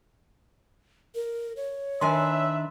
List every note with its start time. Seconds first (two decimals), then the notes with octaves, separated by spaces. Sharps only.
1.15 A#4
1.57 C#5
2.01 D#3 D4 B4 E5 G#5 C6